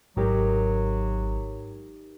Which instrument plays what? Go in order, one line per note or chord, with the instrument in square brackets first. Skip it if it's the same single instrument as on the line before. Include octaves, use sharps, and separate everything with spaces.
[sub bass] G#1 [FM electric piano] G#2 [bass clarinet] F#3 [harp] D#4 G4 A#4